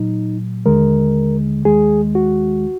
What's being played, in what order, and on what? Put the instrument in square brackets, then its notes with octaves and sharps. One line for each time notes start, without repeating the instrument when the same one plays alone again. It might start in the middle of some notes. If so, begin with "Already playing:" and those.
Already playing: [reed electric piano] A#2 F#3 D#4
D#2 D3 G#3 A#4
D#2 D#3 G#3 G#4
F#4